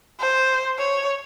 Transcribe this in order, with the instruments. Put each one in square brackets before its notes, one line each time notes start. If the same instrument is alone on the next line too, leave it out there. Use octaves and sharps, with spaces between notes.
[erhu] C5
C#5